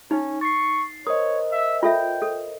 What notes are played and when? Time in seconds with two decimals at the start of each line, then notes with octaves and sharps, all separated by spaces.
0.11 C#4 D#4
0.41 C#6 A6 C7
1.07 A#4 C5 C#5 D#5 D#6
1.52 E5
1.83 F4 A4 E5 G5
2.22 A4